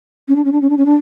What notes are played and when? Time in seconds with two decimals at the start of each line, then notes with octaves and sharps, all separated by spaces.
0.28 C#4
0.36 D4
0.45 C#4
0.52 D4
0.61 C#4
0.70 D4
0.77 C#4
0.86 D4